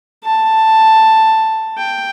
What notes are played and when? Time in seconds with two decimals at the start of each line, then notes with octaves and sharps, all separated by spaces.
0.24 A5
1.78 G5